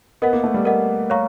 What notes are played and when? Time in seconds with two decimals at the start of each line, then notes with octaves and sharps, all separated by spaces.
0.22 B3 A#4 D#5 F#5
0.33 A#3
0.44 A3
0.54 G3
0.65 A#4 D#5 F#5
1.10 C#5 F5 A#5 C#6